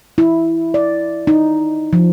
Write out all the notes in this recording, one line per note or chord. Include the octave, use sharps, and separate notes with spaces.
E4
D5
D#4
F3